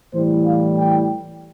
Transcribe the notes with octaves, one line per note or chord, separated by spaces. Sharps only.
A2 E3 G3 C5
F5
G5